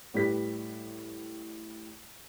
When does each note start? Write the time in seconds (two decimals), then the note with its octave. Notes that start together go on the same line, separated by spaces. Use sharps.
0.14 A2 G3 G4 B4 B6